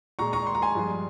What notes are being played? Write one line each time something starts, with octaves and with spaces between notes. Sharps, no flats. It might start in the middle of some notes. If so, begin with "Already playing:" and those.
A#2 G#3 A#5 C#6
A#5 C#6
C6
A#5
G#5 C6
G2 F3 G#3